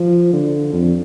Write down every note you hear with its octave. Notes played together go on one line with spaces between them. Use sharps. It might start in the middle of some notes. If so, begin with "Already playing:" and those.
Already playing: F3
D3
F2